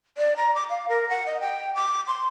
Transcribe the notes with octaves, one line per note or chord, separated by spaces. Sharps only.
D5
A#5
D6
F5
A#4
F#5
D#5
G5
D6
C6